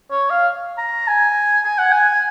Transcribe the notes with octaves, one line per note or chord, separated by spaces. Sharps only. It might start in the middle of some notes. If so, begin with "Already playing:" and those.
C#5
F5
A#5
G#5
G#5
F#5
G#5